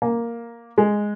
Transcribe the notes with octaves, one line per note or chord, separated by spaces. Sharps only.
A#3
G#3